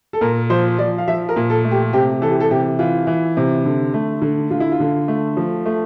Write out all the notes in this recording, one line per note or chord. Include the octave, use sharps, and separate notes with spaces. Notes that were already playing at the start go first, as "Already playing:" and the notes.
A4
A#2 A#4
F3 C5
F3 D5
F5
F3 E5
A#4
A#2
A4
A3
G4
C3 G4
E3 A4
G4
A4
C3 G4
E3 F4
E3
C3
D3
A3
D3
D3 F4
E4
F4
D3
A3
F3
A3